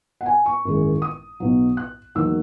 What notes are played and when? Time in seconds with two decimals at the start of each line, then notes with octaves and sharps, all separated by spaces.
0.21 F#5
0.26 G#5
0.46 C#6
0.65 G#1 F#2 E3 G#3
1.02 D#6
1.40 B1 B2 F#3
1.77 F#6
2.15 E1 D#2 D#3 F#3 E6